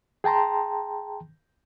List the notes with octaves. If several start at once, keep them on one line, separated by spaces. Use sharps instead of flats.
G#4 G5 A5 A#5 C6